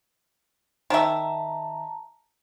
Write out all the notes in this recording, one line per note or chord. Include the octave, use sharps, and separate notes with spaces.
D#3 E5 A5 A#5